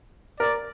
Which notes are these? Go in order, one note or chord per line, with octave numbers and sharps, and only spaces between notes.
A#4 D5